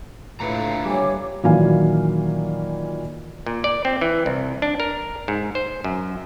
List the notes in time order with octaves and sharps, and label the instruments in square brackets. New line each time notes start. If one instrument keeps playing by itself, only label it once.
[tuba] A2 [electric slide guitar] D3 F4 A#5 [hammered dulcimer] A#3 B4 E5
[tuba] G3 [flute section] C#5 G#5 D6
[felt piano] A#2 D#3 E3 F#3 F5 G#5
[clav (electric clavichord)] A#2
D5
C4
E3
C2
D4
A#4
G#2
C5
F#2